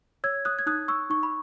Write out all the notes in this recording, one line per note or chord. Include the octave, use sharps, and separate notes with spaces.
C#5 E6 G#6
D#6 F#6
G#6
D#4 D#6 F#6
C#6 E6
D#4 C#6
B5